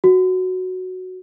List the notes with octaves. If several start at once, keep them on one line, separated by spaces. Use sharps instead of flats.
F#4